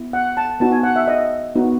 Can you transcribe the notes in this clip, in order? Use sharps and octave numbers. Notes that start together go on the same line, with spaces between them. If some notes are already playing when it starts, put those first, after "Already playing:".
Already playing: B3 E4
F#5
A5
B3 D#4 F#4 A5
G#5
F#5
E5
D#5
B3 D#4 F#4